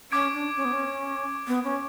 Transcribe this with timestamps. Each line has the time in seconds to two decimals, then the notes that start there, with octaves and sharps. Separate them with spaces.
0.12 C#4 D6 G#6 D7
0.34 D4
0.57 C#4
0.65 B3
0.73 C#4
1.47 B3
1.64 C#4